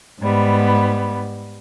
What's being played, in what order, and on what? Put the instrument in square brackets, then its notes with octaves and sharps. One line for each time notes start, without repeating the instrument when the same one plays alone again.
[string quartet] G#2 G3 B3